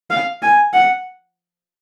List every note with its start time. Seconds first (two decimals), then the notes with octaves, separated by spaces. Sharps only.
0.10 F5
0.42 G#5
0.73 F#5